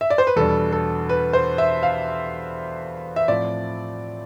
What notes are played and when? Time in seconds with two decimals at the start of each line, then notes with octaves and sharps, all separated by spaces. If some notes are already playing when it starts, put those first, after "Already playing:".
0.01 E5
0.10 D5
0.18 C5
0.27 B4
0.36 E2 B2 G3 D4 A4
0.72 A4
1.09 B4
1.33 C5
1.58 E5
1.83 F5
3.16 E5
3.28 A2 F3 C4 D5